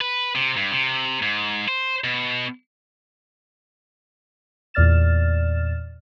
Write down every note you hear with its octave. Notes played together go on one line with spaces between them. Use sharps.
B4
C3
G2
C3
G#2
C5
B2
E2 A#2 D5 F6 A6 E7